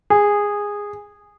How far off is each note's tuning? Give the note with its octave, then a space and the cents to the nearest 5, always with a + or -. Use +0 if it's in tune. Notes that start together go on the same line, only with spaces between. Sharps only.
G#4 -15